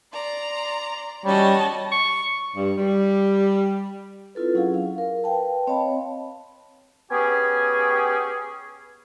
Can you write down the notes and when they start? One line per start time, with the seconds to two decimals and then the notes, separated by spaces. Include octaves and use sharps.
0.12 D5 A#5 C6
1.25 G3 C#4 F#4 C#5 D#5 A5
1.92 C#6
2.56 G2
2.78 G3
4.35 C4 E4 F4 A4 B4
4.55 F#3 C#4 E4 G#4 F5 F#5
4.74 F5
4.98 A#4
5.24 B4 F5 G5 A5
5.67 C4 C#5 D#5 F5 A5 B5
7.11 B3 C#4 G4 G#4 G#5